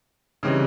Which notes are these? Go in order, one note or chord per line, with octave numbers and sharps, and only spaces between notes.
C#3 E3 G3 C4 D#4